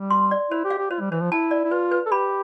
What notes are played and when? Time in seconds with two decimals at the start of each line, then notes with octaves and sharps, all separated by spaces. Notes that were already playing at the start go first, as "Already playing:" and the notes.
Already playing: G3
0.10 C6
0.31 D5
0.51 E4 C5
0.65 G4
0.70 F5
0.78 G4
0.91 F4 C5
1.01 G3
1.11 E3 C5
1.21 F3
1.31 E4 A5
1.51 D5
1.64 E4
1.71 F4 B4
1.92 B4
2.06 A4
2.12 G4 B5